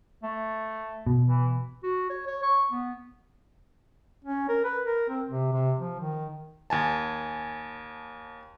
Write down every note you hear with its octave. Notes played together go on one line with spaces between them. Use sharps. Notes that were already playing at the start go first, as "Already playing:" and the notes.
A3
B2
E3
F#4
C#5
C#5
C#6
B3
C#4
A#4
B4
A#4
C4
C3
C3
F3
D#3
D#2 G#5 A5